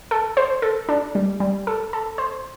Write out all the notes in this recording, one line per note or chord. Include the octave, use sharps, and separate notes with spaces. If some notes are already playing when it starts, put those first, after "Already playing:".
A4
C5
A4
D4
G3
G3
A4
A4
C5